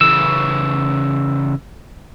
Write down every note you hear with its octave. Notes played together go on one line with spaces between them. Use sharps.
C#3 E3 E6